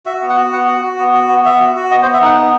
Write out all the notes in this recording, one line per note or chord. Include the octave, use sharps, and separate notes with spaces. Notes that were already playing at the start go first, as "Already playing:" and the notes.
F#4 E5
B3
F#5
F#4
B3 F#5
F#4
F#4
B3
F#4
B3
B3 E5
F#4
F#4
B3 D#5
C5
B3
E5
D#4 F#5
B3